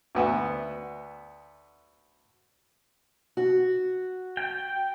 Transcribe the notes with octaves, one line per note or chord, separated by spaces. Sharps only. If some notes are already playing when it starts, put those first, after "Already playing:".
D2 B3 E5
F#4
G5